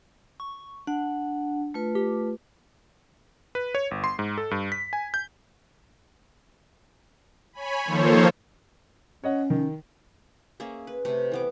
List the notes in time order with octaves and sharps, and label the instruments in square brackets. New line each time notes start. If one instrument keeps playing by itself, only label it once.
[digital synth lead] C#6
[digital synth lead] D4 [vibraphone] F#5
[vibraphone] A3 F4 B4
[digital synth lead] G4
[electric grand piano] B4
C#5
G1
C6
G#2
A4
G2
B6
G#5
G6
[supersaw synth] C#5 G#5 B5
D#3 F3 A#3 A4 C5 C#5
[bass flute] C#4 [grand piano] C#5 D#5 F#5
[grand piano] D#3
[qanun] A#3 C#4 G#4 E5
B4
C3 A3 C4 B4
E3 B3 D6